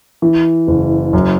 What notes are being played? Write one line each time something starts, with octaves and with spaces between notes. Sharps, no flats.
E3
F#1
F#2